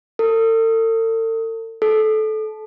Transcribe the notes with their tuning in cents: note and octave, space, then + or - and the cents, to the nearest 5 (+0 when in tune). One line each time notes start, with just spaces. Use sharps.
A4 +40
A4 -20